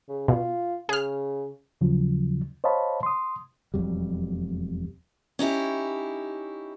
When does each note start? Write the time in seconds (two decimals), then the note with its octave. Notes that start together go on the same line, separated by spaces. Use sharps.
0.09 C#3
0.28 B2 F4
0.89 C#3 G#4 F6
1.81 D#2 C#3 F3 F#3
2.64 C5 C#5 D#5 F5 A5 B5
3.03 C6 D#6
3.74 E1 F2 F#3 G3
5.39 C#4 D#4 E4 G4